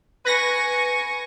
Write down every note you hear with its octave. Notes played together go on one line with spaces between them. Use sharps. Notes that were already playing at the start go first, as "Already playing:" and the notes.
B4 G#5 C#6 A#6